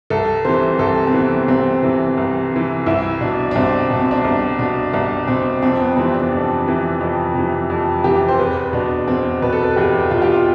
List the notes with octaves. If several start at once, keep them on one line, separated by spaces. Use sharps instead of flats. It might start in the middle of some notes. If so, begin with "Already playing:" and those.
C2 A4
C3 E3 C5
C2 A4
C4
C3 E3 B3
C2 C4
C3 E3
C2
C3 E3
C2 E4
B2 D4
D4
C2 C4
B2 D4
C4
D4
C2
B2 D4
C2 D4
B2 C4
F2 C4
B3
C3 E3 C4
D4
F2
C3 E3
F2
C3 E3
F2
C3 E3 G4
C5
E2 B4
B2 D4
E2 C4
B2 B4
A4
B4
E2 G4
B2 F4
G4
F4